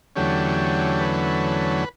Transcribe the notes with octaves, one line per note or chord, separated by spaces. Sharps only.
E2 D3 F#3 A3 C#4 G4
B4